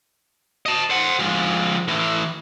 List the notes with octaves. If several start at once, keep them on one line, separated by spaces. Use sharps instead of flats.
D#5 A5
C5 F#5
F3 G#3
A2 E3